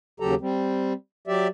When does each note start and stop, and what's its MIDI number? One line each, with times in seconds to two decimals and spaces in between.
0.20 0.35 39
0.20 0.35 49
0.20 0.35 54
0.20 0.35 67
0.20 0.35 69
0.20 0.35 82
0.41 0.93 55
0.41 0.93 60
1.27 1.48 54
1.27 1.48 67
1.27 1.48 74
1.27 1.48 76